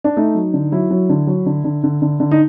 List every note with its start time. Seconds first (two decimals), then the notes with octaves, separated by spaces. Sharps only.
0.04 D4
0.17 A3 D#4
0.35 F#3
0.54 D3
0.72 F#3 E4
0.90 F#3
1.09 D3
1.27 F#3
1.46 D3
1.64 D3
1.84 D3
2.02 D3
2.20 D3
2.31 D#4